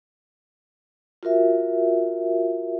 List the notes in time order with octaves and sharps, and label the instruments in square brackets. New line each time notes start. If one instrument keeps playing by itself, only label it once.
[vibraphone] F4 F#4 A#4 E5